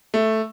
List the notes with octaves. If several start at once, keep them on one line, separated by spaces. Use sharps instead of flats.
A3